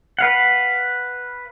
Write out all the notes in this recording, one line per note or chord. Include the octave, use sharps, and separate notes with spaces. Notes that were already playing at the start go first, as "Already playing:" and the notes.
B4 F5 F#5